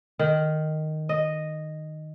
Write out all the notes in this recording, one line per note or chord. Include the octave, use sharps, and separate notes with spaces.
D#3
D#5